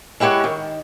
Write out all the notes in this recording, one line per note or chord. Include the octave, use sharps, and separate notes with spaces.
G#3 E4 G4 C5 C#5 F#5
D#3